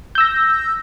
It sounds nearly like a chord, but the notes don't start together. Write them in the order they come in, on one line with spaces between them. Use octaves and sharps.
G6 E6 A#6